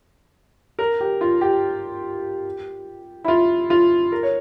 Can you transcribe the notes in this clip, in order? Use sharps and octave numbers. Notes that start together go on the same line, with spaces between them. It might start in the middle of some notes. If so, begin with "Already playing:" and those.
A#4
G4
F4
G4
E4
F4
F4
A#4
C#5